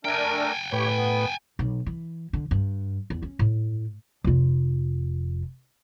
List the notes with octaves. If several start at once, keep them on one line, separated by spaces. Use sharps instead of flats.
A3 D4 A#4 G5 G#5
A2 G4 B4 C#5
B3
B1
E3
D3
G2
E2
C#4
A2
F1 F4